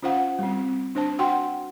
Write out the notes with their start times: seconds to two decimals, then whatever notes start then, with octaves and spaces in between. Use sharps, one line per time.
0.03 C#4 F4 C5 F5 F#5
0.39 G3 C4
0.95 D4 C5 A5
1.19 F#4 F#5 G5 C6